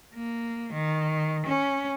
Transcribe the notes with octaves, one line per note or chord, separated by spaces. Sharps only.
A#3
D#3
C#4